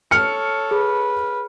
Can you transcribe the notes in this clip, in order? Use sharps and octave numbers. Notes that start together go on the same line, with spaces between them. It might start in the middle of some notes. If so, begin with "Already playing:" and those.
A4 C#5 F6 C#7
G#4 B4